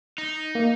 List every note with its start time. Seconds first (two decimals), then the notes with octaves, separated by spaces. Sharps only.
0.18 D#4
0.55 A#3